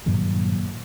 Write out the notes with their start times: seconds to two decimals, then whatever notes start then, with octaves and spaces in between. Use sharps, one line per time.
0.06 G2 A#2 D#3 F#3